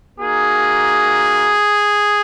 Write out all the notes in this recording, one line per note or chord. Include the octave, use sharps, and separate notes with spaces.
A#3 D#4 F#4 G#4